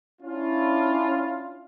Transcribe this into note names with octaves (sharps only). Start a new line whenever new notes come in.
C#4 D4 E4 F4